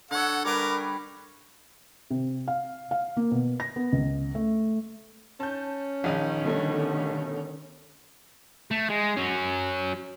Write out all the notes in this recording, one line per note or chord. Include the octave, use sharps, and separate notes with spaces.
D3 A4 C#5 F#5
G3 A#4 B4 D6
C3
F5
F5
A#3
B2
A#6
B3
C#2
A3
C#4 A5 G6
A#1 D#3 D#4 D#5
B2 D3 D#3 G3 A3
A3
G#3
F#3 C#4